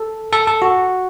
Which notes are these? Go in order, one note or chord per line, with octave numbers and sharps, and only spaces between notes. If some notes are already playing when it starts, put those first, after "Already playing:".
Already playing: A4
A4
A4
F#4